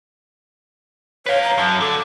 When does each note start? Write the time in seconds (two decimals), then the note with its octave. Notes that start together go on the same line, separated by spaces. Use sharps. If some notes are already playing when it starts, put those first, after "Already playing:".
1.26 B4 C#5 F5
1.44 A#5
1.58 F#2 A5
1.80 D3 A4